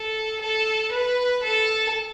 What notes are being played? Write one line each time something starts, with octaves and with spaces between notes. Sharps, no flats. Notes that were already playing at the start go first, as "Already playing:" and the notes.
Already playing: A4
A4
B4
A4